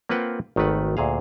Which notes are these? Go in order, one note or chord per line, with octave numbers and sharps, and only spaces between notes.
A#3 C4 F4 B4 F#5 G5
G#1 D#3 A3 B4 F#5
D2 A#2 G#4 F5